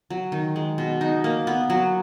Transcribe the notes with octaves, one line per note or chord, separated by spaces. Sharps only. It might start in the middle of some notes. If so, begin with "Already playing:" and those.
F#3
D#3
G#3
B2
D#4
A#3
B3
F#3